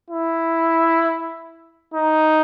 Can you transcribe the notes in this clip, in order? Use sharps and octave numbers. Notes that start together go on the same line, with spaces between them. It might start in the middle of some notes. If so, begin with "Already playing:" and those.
E4
D#4